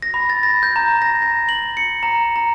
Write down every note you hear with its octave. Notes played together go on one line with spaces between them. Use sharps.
A#6
B5
A6
A#6
G6
A#5
A#6
A#6
F#7
C#7
A#5
A#5